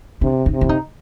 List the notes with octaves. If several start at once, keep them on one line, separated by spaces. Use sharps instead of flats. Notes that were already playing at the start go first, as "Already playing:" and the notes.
C3 D4
D#4
C3
E4
D#4